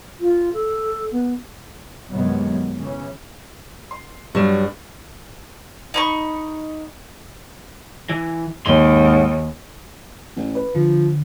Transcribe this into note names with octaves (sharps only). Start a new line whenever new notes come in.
F4
A4
B3
F#2 C3 D#3 F#3 G#3 B3
C#3 E3 C#4
C6
G2 F#3 G3 E7
D#4 B5 C#6
E3
D#2 G#2 C6
A1
B4
D3 F3